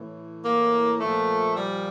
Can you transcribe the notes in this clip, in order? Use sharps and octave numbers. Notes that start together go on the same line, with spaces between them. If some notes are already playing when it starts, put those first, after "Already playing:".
Already playing: A2 E3
A#3
A#2 F3 A3
G3